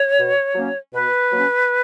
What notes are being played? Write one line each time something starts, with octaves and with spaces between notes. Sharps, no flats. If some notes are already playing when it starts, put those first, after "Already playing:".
Already playing: C#5
B2
F#3 A#3 C#4
B2 B4
F#3 A#3 C#4